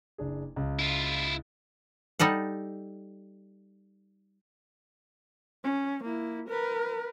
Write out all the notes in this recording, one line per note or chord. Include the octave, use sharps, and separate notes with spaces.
F#1 D4 G#4
C#2 C#3
E4 F4
G3 D#4 A4 F#5
C#4
A#3 E4
A#4 B4